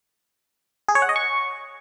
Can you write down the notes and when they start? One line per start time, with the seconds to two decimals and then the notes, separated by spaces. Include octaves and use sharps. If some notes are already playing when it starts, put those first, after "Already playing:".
0.88 G#4
0.95 C#5
1.02 F#5
1.09 D#5
1.16 C#6